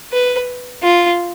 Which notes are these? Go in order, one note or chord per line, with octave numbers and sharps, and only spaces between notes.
B4
F4